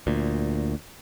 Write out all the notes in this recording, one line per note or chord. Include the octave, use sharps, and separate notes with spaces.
D2 A#2